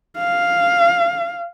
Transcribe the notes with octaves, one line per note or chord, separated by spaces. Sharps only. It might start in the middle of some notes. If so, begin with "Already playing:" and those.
F5